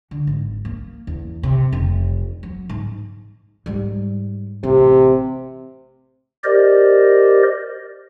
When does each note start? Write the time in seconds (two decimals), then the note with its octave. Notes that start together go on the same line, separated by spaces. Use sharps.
0.11 D3
0.27 G#1
0.65 A#3
1.07 E2
1.43 C3
1.72 F1
2.43 F#3
2.69 G#2
3.66 G#2 G3
4.63 A1 C3
6.44 G4 A#4 C5 D5 D#5